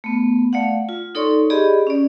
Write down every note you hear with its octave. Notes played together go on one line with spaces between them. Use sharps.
A3 B3
A3 D5 F5 F#5
F4
D#4 A4 C#5 D5 C6 C#6
G4 G#4 D5 D#5 B5
C#4 D5